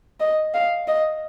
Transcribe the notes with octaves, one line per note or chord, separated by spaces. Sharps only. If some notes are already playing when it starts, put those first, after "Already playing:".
D#5
F5
D#5